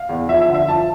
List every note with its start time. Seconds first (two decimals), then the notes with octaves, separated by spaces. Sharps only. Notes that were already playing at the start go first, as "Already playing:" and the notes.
Already playing: F5
0.09 E2
0.28 F3 E5
0.41 E5
0.49 D3
0.54 E5
0.68 F3 A5